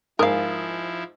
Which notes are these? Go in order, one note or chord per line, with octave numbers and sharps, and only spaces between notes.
G#2 F3 E4 A#4 F5 D#6